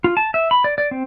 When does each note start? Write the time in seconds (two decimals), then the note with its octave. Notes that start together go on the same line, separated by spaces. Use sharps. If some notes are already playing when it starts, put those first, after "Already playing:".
0.04 F4
0.17 A5
0.34 E5
0.51 B5
0.64 D5
0.78 D5
0.91 C4